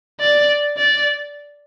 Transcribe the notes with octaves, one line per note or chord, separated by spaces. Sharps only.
D5
D5